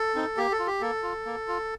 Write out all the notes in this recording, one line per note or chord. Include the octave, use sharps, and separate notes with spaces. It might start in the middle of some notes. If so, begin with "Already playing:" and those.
Already playing: A4
C4 D#4
A#3 G4
A4
F4
G4
A#3 A4
F4
A#3
F4